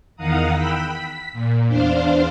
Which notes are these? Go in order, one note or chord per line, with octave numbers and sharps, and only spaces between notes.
E2 D#3 F5 F#5 A#5 D#6
G5 B5 E6 F#6
B6
A#2
E2 D4 C5 F5